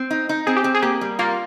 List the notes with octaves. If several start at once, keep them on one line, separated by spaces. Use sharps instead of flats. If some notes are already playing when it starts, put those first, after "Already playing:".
Already playing: C4
D#4
D#4
C4 G#4
G4
C4
G#4
A#3 G4
G3
A#3 F4